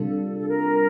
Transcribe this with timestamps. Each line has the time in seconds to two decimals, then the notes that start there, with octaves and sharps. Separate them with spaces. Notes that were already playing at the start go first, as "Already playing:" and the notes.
Already playing: C3 G3 D4 F4 A4
0.38 A4
0.47 A#4